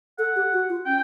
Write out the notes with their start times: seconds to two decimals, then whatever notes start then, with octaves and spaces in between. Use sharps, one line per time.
0.18 A4 F#5
0.36 G4
0.53 F#4
0.69 F4
0.86 C#4 G5